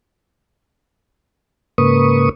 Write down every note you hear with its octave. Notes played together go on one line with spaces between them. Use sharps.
G#2 C#3 A#3 B4 C#6 D#6